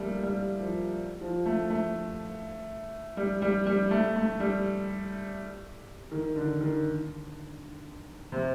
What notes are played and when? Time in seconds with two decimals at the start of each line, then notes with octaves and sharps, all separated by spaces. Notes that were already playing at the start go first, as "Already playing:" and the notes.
Already playing: G3 A3 A#3
0.23 G3
0.60 F3
1.21 F3
1.46 A3
1.70 A3
3.17 G3
3.42 G3
3.66 G3
3.91 A3
4.16 A3
4.40 G3
6.11 D#3
6.36 D3
6.61 D#3
8.32 C3